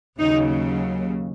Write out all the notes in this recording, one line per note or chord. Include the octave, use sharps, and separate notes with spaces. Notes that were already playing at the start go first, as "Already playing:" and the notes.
D#2 C#3 F#3 D#4